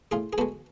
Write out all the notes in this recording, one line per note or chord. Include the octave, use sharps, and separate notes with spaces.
A2 F4 G#4
G#4
G#3 B3 F#4 A4